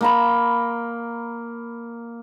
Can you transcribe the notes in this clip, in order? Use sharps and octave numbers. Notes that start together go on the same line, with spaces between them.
A#3 A#5 B5